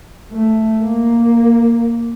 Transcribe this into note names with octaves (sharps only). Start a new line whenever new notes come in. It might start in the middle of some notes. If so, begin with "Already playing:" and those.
A3
A#3